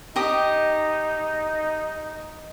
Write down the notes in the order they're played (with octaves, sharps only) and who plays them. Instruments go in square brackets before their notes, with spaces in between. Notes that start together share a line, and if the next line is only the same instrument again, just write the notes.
[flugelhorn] D#4 [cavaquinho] G4 D#5 D#6